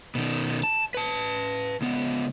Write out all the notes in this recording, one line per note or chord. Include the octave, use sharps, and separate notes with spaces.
B2 D#3
A5
B4 A5
C#2 B3